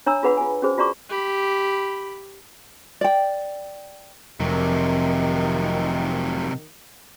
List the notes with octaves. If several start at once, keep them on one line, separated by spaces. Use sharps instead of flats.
D4 C#5 A#5 B5 E6
F4 G#4 B4 F#5 B5
F4 G#5
C#4 F#4 G#4 C5
F4 F#4 D5 A#5 C#6 D6
G4 B5
D5 G5
F1 C3 D#3 F#3